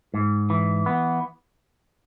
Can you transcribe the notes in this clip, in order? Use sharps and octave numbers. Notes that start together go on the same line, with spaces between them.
G#2
E3
B3